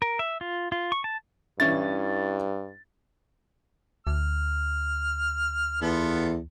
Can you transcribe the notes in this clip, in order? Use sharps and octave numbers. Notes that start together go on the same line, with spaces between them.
A#4
E5
F4
F4
C#6
A5
G2 E3 C#4 E4 A6
D2 F6
E2 B3 F4 A4